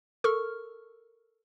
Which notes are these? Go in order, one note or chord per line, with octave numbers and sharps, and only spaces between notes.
A4 A#4 C#6 F6